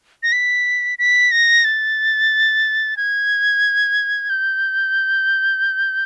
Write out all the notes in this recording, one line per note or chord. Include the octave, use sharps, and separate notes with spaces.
A#6
B6
B6
A#6
A6
G#6
G6